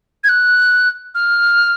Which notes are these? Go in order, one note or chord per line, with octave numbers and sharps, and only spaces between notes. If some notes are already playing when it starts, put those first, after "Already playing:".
G#6
F#6
F6